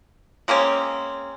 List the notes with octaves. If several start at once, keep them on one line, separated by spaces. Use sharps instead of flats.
G#3 A#3 C4 C#4